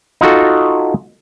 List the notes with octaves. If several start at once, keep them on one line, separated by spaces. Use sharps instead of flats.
D#4 F4 F#4 A4